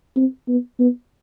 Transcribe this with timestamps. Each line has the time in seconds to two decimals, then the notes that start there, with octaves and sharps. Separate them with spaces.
0.16 C4
0.48 B3
0.79 B3